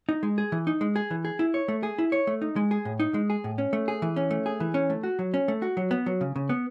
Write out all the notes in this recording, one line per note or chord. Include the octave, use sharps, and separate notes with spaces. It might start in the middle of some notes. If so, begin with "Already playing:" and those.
D#4
G#3
G#4
E3
D#4
G#3
G#4
E3
G#4
E4
C#5
A3
G#4
E4
C#5
A3
D#4
G#3
G#4
A2
D#4
G#3
G#4
A2
C#4
A3
G#4
E3
C#4
A3
G#4
E3
C#4
A3
F#4
F#3
C#4
A3
F#4
F#3
B3
F#3
C#3
C#3
B3